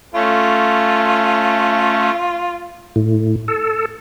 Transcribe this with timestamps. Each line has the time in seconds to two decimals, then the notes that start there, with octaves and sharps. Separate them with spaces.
0.14 A3 C#4 F4
2.96 A2
3.48 A4